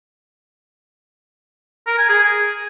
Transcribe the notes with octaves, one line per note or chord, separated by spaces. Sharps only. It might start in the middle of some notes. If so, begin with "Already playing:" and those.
A#4
G#5
G#4